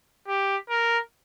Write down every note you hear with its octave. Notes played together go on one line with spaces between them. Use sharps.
G4
A#4